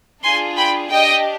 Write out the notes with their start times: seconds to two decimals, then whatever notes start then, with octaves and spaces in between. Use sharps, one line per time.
0.23 D4 F4 G#4 G#5 C6
0.57 G5 B5
0.90 D4 G4 D#5 G5